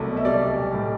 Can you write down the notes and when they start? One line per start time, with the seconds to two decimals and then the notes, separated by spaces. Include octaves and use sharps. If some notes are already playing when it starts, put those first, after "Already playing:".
Already playing: C2 F#3 A3
0.09 B2
0.17 E5
0.25 G3 D5
0.42 B1
0.57 B1
0.74 A2